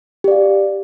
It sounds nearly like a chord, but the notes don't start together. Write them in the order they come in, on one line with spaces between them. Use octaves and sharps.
G4 D5 F5